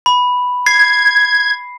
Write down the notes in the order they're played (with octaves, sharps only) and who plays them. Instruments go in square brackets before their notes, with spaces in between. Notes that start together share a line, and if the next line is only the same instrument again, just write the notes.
[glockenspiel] B5
[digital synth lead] G#6 [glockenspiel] C7